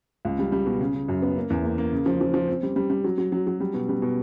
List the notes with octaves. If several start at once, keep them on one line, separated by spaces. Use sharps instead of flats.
C#2
G3
G3
B2
C#3
C#3
F#2
B3
A#3
E2
A#3
A#3
C#3
F3
F3
F3
C4
G3
G3
G3
F#3
F#3
F#3
F#3
G3
B2
G3
B2